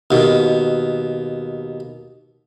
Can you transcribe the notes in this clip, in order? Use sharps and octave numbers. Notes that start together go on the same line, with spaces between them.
D#2 B2